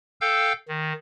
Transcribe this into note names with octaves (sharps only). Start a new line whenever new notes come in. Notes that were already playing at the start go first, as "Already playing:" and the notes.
A4 F5 G5 E6 G6
D#3